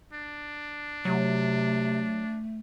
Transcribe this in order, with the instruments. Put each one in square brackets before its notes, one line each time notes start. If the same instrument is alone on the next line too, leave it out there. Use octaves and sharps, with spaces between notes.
[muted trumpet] D4
[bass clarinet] C3 [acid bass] F#3 [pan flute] A3